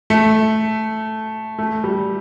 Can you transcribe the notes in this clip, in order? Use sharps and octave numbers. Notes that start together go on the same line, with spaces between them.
A3
A3
G3